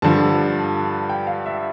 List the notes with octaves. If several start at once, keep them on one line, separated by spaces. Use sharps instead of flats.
G2 D3 F3 A5
G5
F5
E5